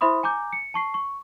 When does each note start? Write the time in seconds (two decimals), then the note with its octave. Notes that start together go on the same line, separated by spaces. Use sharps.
0.01 E4 C5 E5 B5 C6 D#6
0.23 G#5 A#5 D6 G6
0.53 C#7
0.74 A5 C#6 C7
0.94 C#6